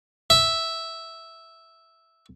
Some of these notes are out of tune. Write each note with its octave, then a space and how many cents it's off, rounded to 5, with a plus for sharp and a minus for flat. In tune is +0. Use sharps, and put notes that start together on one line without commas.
E5 -5